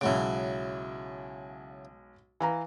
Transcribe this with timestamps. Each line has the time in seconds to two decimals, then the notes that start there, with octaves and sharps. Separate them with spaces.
0.01 B1 C#3 F#3 G#3 E4 D7
2.40 E3 F5 A#5